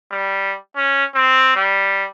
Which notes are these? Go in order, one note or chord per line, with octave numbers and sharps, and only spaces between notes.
G3
C#4
C4
G3